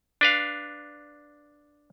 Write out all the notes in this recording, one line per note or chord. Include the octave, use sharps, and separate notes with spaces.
D4 B4 F5